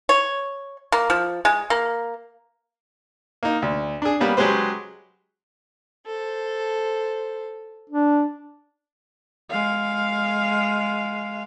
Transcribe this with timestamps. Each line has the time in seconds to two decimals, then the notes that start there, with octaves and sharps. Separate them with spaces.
0.09 C#5
0.92 A#3
1.10 F3
1.45 G#3
1.70 A#3
3.43 A#3 D#4
3.62 D2
4.02 D4 G#4
4.20 G3 A#3 B3 C#4
4.37 F#3 G#3 C#4 G4 B4 C5
6.06 A4 C5
7.90 D4
9.51 G#3 F5